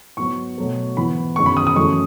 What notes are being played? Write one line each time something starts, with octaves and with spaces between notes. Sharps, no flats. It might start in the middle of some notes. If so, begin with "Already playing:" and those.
G#2 F#3 B3 C#6
B2 F#3 A3
G#2 E3 B3 B5
F#2 D#3 G#3 B3 C#6
B5
D#6
D#6
F#2 E3 A3 C#6